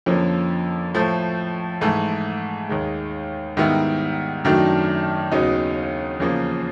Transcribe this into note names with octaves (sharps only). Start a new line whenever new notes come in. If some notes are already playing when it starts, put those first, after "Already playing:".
F2 D3 F3 A#3 C#4
A2 F3 A3
G#2 E3 A3
D#2 D#3 G#3
G#2 D#3 G3 B3 E4
F#2 D#3 F#3 A3 D4
D#2 C#3 F#3 B3 D#4
E2 C#3 F3 A#3